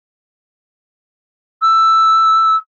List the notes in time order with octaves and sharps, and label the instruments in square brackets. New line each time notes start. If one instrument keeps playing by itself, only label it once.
[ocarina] E6